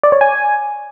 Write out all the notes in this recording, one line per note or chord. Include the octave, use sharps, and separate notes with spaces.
D5
C#5
G#5